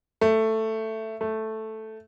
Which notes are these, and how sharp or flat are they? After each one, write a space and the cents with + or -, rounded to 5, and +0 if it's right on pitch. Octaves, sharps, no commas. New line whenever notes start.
A3 +10
A3 +0